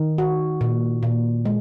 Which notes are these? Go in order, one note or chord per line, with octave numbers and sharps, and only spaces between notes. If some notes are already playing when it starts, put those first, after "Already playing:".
Already playing: D#3
F#4
A#2
A#2
G#3